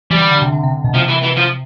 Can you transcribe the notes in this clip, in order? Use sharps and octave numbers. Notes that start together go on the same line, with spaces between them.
E3 G3
D3
D3
C3
D3
C3
C3
B2
C3 F3
E3
E3
F3